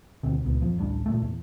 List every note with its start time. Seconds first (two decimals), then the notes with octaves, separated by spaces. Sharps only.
0.23 D2 B2 C4
0.43 C#2 A#2 B3
0.62 F2 F3
0.78 D1 A1 G3 D4
1.06 A#2 A3
1.22 E2